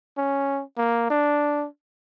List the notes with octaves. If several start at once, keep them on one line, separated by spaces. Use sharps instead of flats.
C#4
A#3
D4